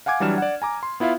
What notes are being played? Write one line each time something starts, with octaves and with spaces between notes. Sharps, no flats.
F5 F#5 G#5 D6 G#6
E3 F#3 G3 D4 F6 E7
D5 F#5
G#5 A#5 D6
C6
B3 E4 F4 E5 F5